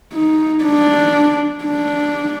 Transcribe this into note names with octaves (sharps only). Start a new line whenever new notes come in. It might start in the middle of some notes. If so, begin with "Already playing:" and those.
D#4
D4
D4